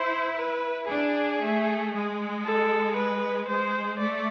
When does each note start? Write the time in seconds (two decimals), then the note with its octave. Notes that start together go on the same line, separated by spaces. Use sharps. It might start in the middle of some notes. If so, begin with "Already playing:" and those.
Already playing: E4 C5
0.36 B4
0.88 D4 G#4
1.40 A3
1.93 G#3
2.44 A4
2.96 B4
3.48 G#3 C5
3.99 A3 D5